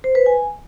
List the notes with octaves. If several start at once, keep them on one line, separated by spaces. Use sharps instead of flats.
C5
B4
G#5